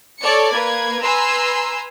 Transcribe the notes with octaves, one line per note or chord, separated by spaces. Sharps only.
A4 C#5 D5 C#7
A#3 B4 G#6
B4 G#5 A#5 C6 E6